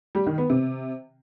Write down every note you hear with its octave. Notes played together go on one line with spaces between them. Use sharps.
G3
D#3
B3
C3